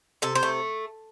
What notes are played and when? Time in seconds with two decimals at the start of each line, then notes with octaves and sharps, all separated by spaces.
0.22 C3 A4
0.35 C5
0.43 A3